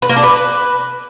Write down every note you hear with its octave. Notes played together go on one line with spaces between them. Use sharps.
B4
A#3
D4
B4